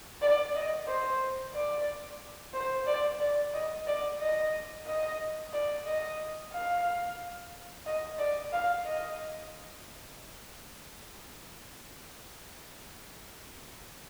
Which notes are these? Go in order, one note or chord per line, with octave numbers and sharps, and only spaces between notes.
D5
D#5
C5
D5
C5
D5
D5
D#5
D5
D#5
D#5
D5
D#5
F5
D#5
D5
F5
D#5